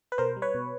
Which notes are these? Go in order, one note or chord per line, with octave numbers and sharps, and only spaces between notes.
B4
B2 A#4 C5
G3
B4 C#5
B2